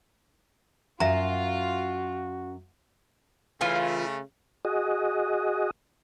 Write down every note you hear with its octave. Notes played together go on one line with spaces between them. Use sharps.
F#2 F4 F#4 E5 A#5
C#3 E3 A3 C#4 F4 G#5
F#4 G#4 D#5